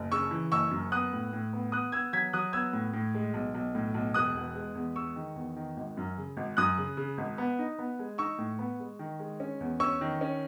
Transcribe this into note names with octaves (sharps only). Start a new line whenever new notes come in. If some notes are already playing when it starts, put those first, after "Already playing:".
Already playing: F#1
C#3 C#6 E6
E3
F#1 C#6 E6
F#2
B3 D#6 F#6
A2
A2
B3
B3 D#6 F#6
B3 E6 G#6
F#3 G#6 B6
F#3 D#6 F#6
B3 E6 G#6
A2
A2
G#3
B1
B1
A2
B1
E1 D#6 F#6
E2
G#3
E2
G#3 C#6 E6
D#3
E2
D#3
G#1
F#2
C#3
G#1
F#2 D#6 F#6
C#3
C#3
G#1
B3
D#4
B3
G#3
D#4 C#6 E6
A2
B3
G#3
D#3
G#3
C#4
E2
C#4 C#6 E6
D#3
C#4